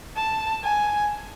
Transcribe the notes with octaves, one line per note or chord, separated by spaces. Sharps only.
A5
G#5